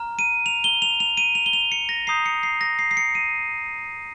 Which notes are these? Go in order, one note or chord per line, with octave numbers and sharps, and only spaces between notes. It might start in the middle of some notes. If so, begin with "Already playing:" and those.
Already playing: A#5 F6
D#7
F7
G7
F7
F7
D#7
F7
G7
F7
C#7
A#6
A#5 D#6 G6 C7
C#7
C7
A#6
C7
C7
C#7
D#7